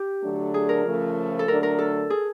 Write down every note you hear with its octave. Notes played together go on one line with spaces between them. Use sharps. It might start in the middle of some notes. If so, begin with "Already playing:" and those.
Already playing: G4
D3 F#3 A3 D4
G#4
A#4
C#3 F3 A3
A4
D3 F#3 A3 D4 A#4
A#4
A4
G#4